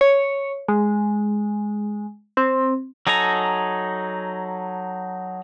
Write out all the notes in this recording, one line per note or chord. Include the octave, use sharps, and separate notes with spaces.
C#5
G#3
C4
F#3 D#4 A4 G#5 A#5